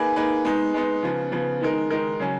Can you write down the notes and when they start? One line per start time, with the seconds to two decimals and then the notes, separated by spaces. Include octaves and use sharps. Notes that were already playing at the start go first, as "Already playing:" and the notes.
Already playing: A#3 D#4 G#4 B4
0.16 A#3 D#4 G#4 B4
0.45 G#3 B3 D#4
0.74 G#3 B3 D#4
1.03 C#3 F3 B3
1.32 C#3 F3 B3
1.61 D#3 G#3 D#4 A#4
1.90 D#3 G#3 D#4 A#4
2.20 C#3 F#3 C#4